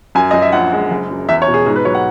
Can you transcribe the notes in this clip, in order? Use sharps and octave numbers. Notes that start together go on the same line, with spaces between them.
F#2 G#5
F#2 D#5
E5
A#1 F#5
G#3
F#1
F#2
E2 E5
C#5
B2
G#4
G#2 G#4
B4
F#3 C#5
F#5